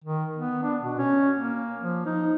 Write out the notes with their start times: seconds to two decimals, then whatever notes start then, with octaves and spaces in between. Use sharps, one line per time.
0.04 D#3
0.37 B3
0.63 D4
0.82 B2
0.99 C#4
1.36 A#3
1.80 F3
2.06 D#4